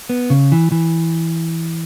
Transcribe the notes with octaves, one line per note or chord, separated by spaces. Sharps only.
B3
C#3
E3
E3